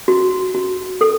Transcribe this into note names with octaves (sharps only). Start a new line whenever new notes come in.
F#4
F#4
A4